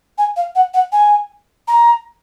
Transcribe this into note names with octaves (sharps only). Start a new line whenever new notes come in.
G#5
F5
F#5
F#5
G#5
A#5